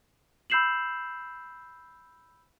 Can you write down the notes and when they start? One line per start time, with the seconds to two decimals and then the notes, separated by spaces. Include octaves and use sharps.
0.50 B5 E6 G6 C7 E7 F#7